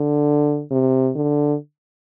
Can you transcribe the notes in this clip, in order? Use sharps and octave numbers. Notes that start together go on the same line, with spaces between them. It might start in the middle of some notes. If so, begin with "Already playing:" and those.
Already playing: D3
C3
D3